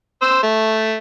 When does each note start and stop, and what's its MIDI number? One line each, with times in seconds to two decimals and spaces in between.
0.22 0.38 72
0.22 0.38 88
0.43 0.97 57